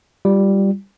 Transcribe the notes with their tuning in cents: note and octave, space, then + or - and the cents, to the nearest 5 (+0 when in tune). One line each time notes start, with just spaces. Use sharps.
G3 +0 F4 +0